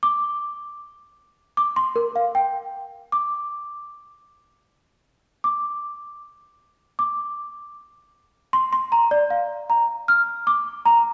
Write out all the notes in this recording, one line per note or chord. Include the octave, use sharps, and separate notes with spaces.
D6
D6
C6
A#4
F5
G5
D6
D6
D6
C6
C6
A#5
D5
F5
A#5
F6
D6
A#5